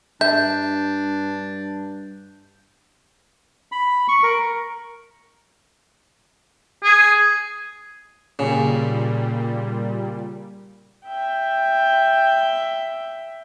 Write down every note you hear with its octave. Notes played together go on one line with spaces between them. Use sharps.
G2 D4 E5 G6
B5
C#6
A#4
G#4
A#2 C#3 G3
E5 G5